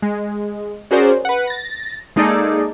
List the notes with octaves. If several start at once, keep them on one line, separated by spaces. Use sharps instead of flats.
G#3
C#4 F#4 G#4 A#4 C5 D5
B4 F#5
A6 A#6
G#3 A#3 D#4 G#4 A4 D5